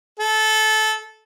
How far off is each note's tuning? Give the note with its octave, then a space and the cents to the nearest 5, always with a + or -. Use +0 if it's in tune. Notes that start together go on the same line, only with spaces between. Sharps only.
A4 -20